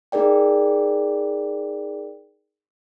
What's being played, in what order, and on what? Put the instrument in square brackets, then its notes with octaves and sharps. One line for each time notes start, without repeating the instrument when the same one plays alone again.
[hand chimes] D#4 G#4 A#4 D5 G5